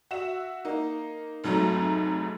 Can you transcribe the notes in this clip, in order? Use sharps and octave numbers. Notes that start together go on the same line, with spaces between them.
F#4 E5 E7
A#3 D#4
F1 G#2 F#3 A3 A#5